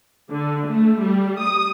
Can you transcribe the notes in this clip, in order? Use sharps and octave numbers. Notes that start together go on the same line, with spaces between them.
D3
A3
G3
D#6